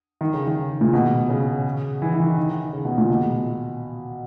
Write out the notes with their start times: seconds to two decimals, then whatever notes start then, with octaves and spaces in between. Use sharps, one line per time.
0.21 D#3
0.34 C#3
0.47 D#3
0.81 A#2
0.93 B2
1.29 C#3
2.02 E3
2.14 E3
2.20 D#3
2.38 D#3
2.73 C#3
2.85 B2
2.98 A#2
3.10 B2